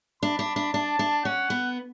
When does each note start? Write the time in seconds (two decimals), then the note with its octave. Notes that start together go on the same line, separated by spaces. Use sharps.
0.23 D4 B5
0.39 D4
0.56 D4
0.73 D4 A5
0.99 D4
1.25 C#4 F#5
1.50 B3